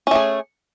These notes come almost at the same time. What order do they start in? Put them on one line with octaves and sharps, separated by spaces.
C#4 A3 G#4